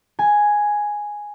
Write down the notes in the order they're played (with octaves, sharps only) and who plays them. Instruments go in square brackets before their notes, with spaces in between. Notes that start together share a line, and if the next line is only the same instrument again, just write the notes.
[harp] G#5